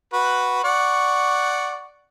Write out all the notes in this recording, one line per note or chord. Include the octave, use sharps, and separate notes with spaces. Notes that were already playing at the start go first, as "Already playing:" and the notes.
F#4 B4
D5 F#5 C#6